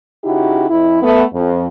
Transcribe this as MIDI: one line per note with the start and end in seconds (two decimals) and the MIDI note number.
0.24 0.69 49
0.24 0.69 63
0.24 0.69 64
0.24 0.69 66
0.24 0.69 67
0.70 1.02 41
0.70 1.02 64
1.02 1.23 57
1.02 1.23 59
1.33 1.67 41